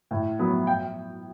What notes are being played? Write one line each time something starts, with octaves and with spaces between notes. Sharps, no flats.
A2
F#3 B3
G5